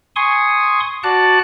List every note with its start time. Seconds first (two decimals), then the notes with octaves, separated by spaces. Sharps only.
0.16 G#5 C6 C#6 D#6
1.03 F#4 D5 F#5 A5 F#6